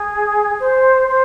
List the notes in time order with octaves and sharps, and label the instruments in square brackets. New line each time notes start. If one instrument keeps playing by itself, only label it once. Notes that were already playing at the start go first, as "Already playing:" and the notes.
Already playing: [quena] G#4
C5
C5